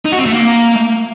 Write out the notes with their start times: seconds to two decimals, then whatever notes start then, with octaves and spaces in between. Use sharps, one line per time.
0.05 D#4
0.12 F#4
0.19 C4
0.26 A3
0.33 A#3